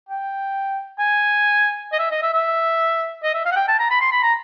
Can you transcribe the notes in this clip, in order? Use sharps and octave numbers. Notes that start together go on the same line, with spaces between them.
G5
G#5
D#5
E5
D#5
E5
E5
D#5
E5
F5
F#5
G5
A5
A#5
B5
C6
B5
A#5